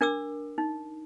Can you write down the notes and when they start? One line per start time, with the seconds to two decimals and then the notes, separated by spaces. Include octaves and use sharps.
0.01 D4 A#4 D6 E6
0.58 D#4